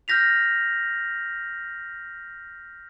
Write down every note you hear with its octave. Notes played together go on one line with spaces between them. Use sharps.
F6 G6 A#6 B6 F7